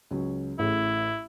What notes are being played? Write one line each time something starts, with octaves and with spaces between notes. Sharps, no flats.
C#2 F#3 C#4
A1 A2 E4 G#4